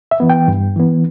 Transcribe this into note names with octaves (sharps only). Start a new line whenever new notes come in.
E5
E3 B3
G5
G2
E3 B3